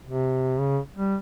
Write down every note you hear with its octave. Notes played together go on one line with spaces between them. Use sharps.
C3
C#3
G3